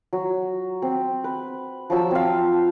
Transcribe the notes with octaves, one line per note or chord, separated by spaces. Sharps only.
F#3
C4
B4
F3 F#3 A5 E6
C4 F5